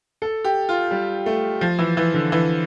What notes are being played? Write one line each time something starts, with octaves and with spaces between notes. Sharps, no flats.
A4
G4
F4
G3
A3
F3
E3
E3
D3
E3